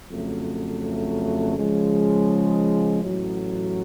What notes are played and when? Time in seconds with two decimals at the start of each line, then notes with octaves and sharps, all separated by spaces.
0.11 F2 C#3 F#3 A3
1.56 C#3 F3 G#3
3.01 A1 A2 F#3